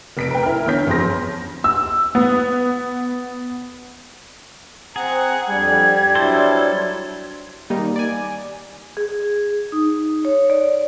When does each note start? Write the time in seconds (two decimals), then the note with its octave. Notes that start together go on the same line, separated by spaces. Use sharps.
0.17 F1 B6 D7
0.31 A#4 B4 G5
0.43 E4 F6
0.66 E2 D3 C#5 G6 B6
0.87 A1 F2 G#4 C6 A#6
1.64 E6
2.15 B3
4.96 C4 G#4 F#5 A#5
5.49 F2 G3 D4 G#6
6.15 F#3 D4 E4 A4 C5
7.70 D#3 G3 A#3 D#4
7.96 D5 G#5
8.97 G#4
9.72 D#4
10.25 C#5
10.50 D5